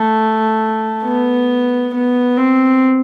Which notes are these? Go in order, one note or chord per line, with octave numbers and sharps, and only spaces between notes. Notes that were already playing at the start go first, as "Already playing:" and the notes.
Already playing: A3
B3
B3
C4